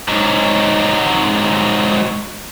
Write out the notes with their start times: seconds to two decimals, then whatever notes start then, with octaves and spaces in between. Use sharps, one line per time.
0.08 G#2 F#3